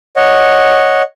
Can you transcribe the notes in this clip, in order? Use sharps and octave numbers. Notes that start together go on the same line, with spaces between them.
C#5 D#5 F#5